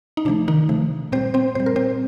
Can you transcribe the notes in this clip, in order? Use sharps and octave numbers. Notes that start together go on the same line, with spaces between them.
D#4
C3 F3 A3 D4
D#3 D#4
C3 F3 A3
A#2 G3 C4 C5
C4 C5
A#2 G3 C5
A#4
C4 C5